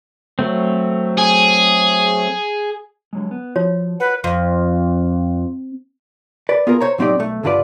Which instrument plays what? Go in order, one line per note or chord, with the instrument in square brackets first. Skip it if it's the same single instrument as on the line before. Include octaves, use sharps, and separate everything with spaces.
[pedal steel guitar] F#3 A3 C4
[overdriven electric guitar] G#4
[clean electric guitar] D3 F#3 G#3
B3
[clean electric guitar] F3 [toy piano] F4 F#4 C#5
[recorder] B4 [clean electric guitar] F#5
[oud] F2
[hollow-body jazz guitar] B4 D5
B3 F4 G#4 A#4
C5 C#5 A#5
A2 F#3 C4 D#4 G4 D5
B1 A3
C2 G2 D3 F4 B4 D5